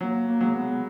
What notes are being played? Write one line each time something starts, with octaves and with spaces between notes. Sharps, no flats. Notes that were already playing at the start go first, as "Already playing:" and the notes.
F#3 A#3
A#3
F#3 G#3
B3